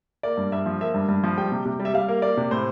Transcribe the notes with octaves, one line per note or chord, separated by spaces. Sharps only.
A#3 D5
G2
G2 E5
F3
A#3 E5
G2
G2
F3
G3 G5
C3
C3
G3
E5
G3 F5
A#3
A#3 D5
C3
A2 C5